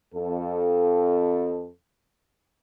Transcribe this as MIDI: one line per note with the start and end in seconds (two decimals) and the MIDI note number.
0.14 1.68 41
0.14 1.68 69